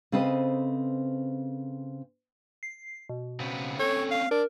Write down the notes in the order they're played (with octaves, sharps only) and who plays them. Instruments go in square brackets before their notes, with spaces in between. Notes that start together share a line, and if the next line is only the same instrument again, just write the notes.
[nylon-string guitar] C#3 C4 A4 B4 C5 D#5
[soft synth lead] C7
B2
[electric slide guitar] C#3 B3 C4
[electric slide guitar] C4 C#4 G5 [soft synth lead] A4 [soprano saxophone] C#5
[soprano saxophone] F5
[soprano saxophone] D4 [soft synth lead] A#4